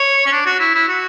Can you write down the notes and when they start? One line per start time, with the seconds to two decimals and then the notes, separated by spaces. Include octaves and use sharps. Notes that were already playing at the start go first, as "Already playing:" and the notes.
Already playing: C#5
0.26 C#4
0.32 D4
0.46 F#4
0.60 E4
0.75 E4
0.88 F#4